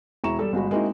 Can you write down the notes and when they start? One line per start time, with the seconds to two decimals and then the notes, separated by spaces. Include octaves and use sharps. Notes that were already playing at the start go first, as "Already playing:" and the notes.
0.24 E1 E4 A#5 C#6 E7
0.39 G3 A4
0.53 G1 G#3 F#4 B5
0.71 G#3 A#3 C4 D#4 E4 F#4